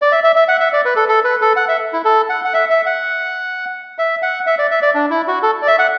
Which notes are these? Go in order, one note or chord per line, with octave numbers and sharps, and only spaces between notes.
D5
E5
E5
E5
F#5
E5
D5
B4
A4
A4
B4
A4
F#5
E5
E4
A4
F#5
F#5
E5
E5
F#5
E5
F#5
E5
D5
E5
D5
D4
E4
F#4
A4
D5
E5
F#5